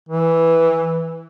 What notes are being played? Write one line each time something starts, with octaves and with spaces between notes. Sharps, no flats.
E3